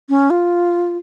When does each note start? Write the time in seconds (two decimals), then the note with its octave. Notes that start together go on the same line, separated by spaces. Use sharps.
0.09 C#4
0.30 F4